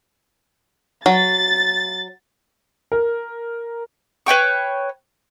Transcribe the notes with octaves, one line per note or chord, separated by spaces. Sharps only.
F#3 A6
A#4
B4 C#5 G5 C#6